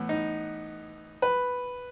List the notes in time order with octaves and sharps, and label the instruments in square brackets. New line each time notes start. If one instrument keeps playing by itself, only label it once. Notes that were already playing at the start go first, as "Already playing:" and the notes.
Already playing: [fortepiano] A2 E3 B3
D#4
B4